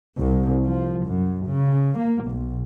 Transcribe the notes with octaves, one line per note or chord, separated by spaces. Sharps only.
C2
F3
F#2
C#3
A#3
B1